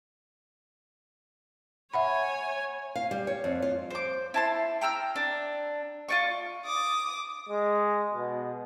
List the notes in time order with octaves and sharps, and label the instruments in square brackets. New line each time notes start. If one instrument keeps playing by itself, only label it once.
[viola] C#5 G#5 [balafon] E5 F#5 B5
[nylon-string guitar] F5
G3
C#5
F2
F4
[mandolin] C5 D6
E4 A5 C6
G5 A#5 E6 F6
D4
F4 D5 C#6
[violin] D6 D#6
[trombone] G#3
B2